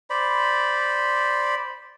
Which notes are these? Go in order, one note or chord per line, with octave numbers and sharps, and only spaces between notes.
C5 D5 B5